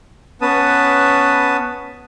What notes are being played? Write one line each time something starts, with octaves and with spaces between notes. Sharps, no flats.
B3 C#4 B4 A5 D#6